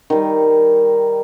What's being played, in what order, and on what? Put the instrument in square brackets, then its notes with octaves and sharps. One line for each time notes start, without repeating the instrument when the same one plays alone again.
[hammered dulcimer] D#3 G3